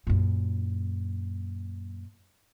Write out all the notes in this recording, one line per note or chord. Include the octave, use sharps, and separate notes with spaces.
F#2 A#2